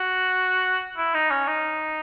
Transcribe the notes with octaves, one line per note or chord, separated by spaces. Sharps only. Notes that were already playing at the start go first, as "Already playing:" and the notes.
Already playing: F#4
E4
D#4
C#4
D#4